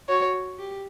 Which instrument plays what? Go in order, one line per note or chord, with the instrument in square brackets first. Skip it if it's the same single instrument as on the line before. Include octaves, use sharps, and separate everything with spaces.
[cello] F#4 [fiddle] C#5
[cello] G4